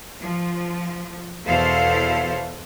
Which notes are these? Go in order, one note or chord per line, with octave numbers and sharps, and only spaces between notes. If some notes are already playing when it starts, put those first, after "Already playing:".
F3
E2 B2 E4 A4 C5 F5